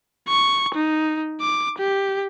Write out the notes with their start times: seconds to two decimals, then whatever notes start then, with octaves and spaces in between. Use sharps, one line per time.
0.28 C#6
0.74 D#4
1.41 D6
1.78 G4